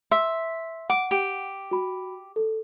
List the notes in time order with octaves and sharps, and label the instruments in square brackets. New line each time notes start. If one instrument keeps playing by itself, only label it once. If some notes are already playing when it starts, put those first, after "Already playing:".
[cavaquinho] E5 [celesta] C6
[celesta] F#5 [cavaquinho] D6
[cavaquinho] G4
[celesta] F#4 B5
A4